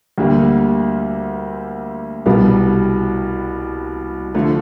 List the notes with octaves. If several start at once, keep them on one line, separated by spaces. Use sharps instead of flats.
D2 D3 G3 A#3
C2 B2 G3
D3 F3 A3